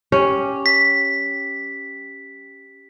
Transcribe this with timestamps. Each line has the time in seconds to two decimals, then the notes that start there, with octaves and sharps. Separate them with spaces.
0.12 C#4 G4
0.66 B6